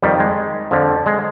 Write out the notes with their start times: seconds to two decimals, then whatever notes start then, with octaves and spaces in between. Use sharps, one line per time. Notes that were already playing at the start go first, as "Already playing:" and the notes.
0.02 F2 D#3 G3
0.20 G#3
0.71 F2 D3 F3
1.06 G#3